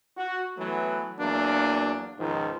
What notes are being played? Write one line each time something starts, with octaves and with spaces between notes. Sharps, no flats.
F#4
E3 F#3 A3 B3
E2 F#3 A#3 D4
C#2 G#2 D#3 F3